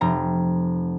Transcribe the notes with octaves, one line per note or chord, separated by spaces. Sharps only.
F1 A#5